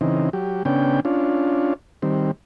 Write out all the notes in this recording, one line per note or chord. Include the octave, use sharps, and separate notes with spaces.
C#3 E3 C4 D#4
F#3 G4
C#3 B3 C#4 D4 G5
C#4 D4 F4
D#3 G3 C4